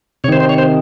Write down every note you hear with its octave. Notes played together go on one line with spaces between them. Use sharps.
C3 D#3 C5 C#5
C5
C#5
C5